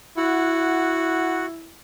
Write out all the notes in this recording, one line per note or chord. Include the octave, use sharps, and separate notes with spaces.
E4 F#4 F#5